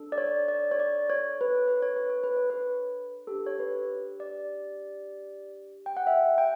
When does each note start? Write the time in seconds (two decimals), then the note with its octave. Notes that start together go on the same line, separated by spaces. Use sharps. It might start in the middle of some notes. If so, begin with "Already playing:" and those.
Already playing: D4 A4
0.12 D5
0.18 C#5
0.48 D5
0.71 C#5
0.79 D5
1.10 C#5
1.41 B4
1.55 C#5
1.68 B4
1.82 C#5
1.96 B4
2.10 C#5
2.24 B4
2.37 C#5
2.50 B4
3.27 D4 G4 A4
3.47 C#5
3.59 B4
4.20 D5
5.86 G5
5.97 F#5
6.07 E5
6.38 G5